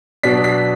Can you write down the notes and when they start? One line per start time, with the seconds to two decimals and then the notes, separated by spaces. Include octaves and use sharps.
0.23 B2 F#3 B3 D4 B6
0.44 B6